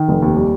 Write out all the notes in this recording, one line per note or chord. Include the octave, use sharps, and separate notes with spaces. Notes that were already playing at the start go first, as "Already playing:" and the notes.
Already playing: D#3
F1
D#2
G3